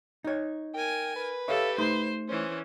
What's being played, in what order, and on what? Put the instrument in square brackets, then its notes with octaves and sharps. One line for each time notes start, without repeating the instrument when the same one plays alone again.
[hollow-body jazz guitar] D#4 C#5
[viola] A#4 G#5 [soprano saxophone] G5
[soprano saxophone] B4
[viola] G4 A4 [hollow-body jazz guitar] C#5 E5 F5
[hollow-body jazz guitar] A3 D#4 C6 [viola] C5
[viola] E3 C#4 [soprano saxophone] C5